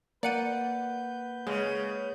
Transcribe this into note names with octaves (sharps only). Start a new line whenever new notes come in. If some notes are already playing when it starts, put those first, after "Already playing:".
A#3 B4 D5 F#5 G6 C#7 D#7
C#3 G#3